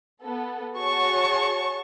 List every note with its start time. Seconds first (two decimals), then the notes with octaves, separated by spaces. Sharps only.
0.22 B3 A4
0.77 F#4 G#4 C#5 A5 C#6